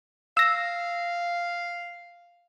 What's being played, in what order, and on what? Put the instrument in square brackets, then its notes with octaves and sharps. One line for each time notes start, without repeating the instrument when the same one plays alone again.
[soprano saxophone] F5 [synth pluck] E6 A#6